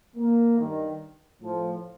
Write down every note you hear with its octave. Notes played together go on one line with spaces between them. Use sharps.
A#3
G2 D#3
A2 F3